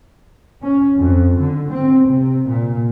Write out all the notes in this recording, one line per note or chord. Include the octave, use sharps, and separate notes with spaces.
C#4
F2
D3
C4
C3
A#2